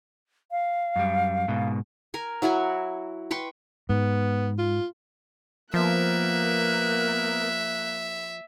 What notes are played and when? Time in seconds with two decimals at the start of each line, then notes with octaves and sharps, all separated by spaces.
0.51 F5
0.96 F#2 G3
1.48 G#2 B2
2.14 A#4 G#5
2.42 F#3 E4 F#4 G#5
3.31 B4 G5 C6 C#6
3.89 G#2 B3
4.58 F4
5.74 F3 A#3 B3 A#4 E5 F#6